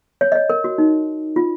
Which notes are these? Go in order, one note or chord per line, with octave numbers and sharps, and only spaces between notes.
C#5
D#5
C#5
A#4
F#4
D#4
F4